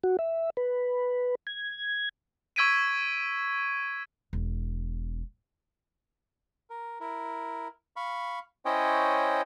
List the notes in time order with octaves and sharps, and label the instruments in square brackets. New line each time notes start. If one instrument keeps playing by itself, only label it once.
[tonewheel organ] F#4
E5
B4
G#6
[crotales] C#6 E6 G#6 B6 D7 D#7
[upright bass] E1
[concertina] A#4
E4 A#4
F5 B5 C#6
C#4 E4 C5 C#5 D#5 G5